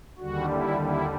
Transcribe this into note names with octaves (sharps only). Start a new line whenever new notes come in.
D#2 D3 G3 F#4
E4
E4